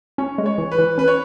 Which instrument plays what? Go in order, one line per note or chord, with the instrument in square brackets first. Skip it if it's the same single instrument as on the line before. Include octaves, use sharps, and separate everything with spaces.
[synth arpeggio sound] C#4 [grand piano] C#5
[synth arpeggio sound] G#3
[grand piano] C#5
[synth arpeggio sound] E3
[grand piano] B4
[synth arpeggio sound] E3
[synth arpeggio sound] C#4 [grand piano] B4
[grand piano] C#5